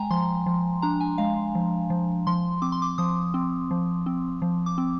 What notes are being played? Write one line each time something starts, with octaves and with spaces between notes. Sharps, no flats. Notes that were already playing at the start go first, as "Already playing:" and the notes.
Already playing: G#3 G5 G#5 A#5
F3 C6
F3
D4 A#5
G#5
G#3 F5
F3
F3
F3 C6
C4 D6
C6
D6
F3 D#6
C4
F3
C4
F3
D6
C4